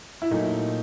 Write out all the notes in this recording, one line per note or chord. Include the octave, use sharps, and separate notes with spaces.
E4
A#2 F#3 A3 D#4